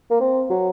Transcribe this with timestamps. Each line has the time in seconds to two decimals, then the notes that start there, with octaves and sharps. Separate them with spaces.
0.10 A#3
0.20 C4
0.50 F#3